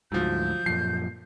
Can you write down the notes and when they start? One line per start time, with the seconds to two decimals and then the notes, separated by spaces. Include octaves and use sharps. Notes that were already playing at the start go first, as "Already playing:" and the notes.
0.12 D2 G#2 F3 F#3 G6
0.66 F#2 A#2 F3 C7